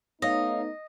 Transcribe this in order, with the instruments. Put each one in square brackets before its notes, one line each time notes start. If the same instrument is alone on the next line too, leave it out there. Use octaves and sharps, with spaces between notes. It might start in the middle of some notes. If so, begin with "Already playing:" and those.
[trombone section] A3 B3 D#4 [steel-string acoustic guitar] C#5 F5 [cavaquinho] D#5